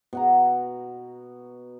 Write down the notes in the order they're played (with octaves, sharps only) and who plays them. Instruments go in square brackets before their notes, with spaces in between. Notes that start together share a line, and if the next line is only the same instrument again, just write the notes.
[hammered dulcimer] B2 F#5 A#5